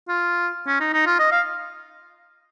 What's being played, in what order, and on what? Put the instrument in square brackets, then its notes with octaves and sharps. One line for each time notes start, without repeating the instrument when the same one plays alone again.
[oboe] F4
C#4
D#4
D#4
F4
D#5
F5